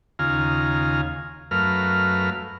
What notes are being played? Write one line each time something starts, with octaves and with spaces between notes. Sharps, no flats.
D#2 C#3 F4 F5 G#5 A#5
F#2 A3 A#4 B4 F5 F6